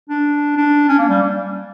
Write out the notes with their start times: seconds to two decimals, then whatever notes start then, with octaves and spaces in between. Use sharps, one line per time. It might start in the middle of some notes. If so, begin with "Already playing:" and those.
0.09 D4
0.57 D4
0.88 C#4
0.98 A#3
1.09 G3